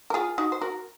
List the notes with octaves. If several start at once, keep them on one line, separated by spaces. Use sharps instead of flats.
A#4
F4 G#4
D#4 F#4
C5
F#4 A#4